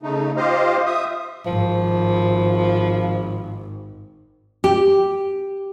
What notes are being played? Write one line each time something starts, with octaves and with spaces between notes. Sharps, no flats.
C#3 A3 D#4
F4 G4 C5 D#5 F5
E5 D#6
G#1 F3
G4